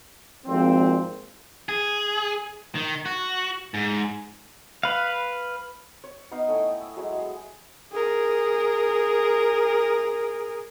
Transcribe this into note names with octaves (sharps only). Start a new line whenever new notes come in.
G#1 F2 A#2 C4
G#4
D#3
F#4
G#2
B4 F5
C#5
B3 D#4 D#5 F5
A3 C#4 E4 G5
E6
F#3 G#3 E4 C#5
G#4
G#4 A#4